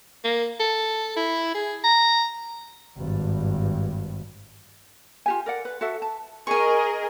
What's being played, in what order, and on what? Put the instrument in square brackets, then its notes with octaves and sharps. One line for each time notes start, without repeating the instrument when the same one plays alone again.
[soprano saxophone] A#3
A4
E4
G#4
A#5
[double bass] G#1 G2
[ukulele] F4 G4 G#5
A#4 D5 F#5
B4
F#4 A4 E5 F#5
A5
[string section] G#4 A#4 D#5 [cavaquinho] G#5 C#6